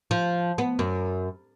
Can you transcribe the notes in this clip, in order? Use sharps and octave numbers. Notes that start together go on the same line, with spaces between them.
F3
B3
F#2